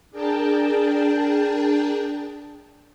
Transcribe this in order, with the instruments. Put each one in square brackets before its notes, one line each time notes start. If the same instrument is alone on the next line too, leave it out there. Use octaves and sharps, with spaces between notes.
[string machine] D4 G#4 A#4 G5 A5